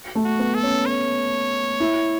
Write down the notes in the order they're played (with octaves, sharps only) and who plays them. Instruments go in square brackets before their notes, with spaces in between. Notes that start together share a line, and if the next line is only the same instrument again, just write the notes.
[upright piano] A3
[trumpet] F#4
[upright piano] B3
[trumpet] A4
[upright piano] C#4
[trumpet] C#5
[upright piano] E4